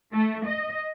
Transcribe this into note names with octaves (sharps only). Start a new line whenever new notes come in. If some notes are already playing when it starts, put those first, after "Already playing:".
A3
D#5